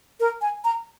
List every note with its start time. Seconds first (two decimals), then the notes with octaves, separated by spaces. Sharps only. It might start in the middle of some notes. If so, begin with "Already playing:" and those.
0.20 A#4
0.41 G#5
0.64 A#5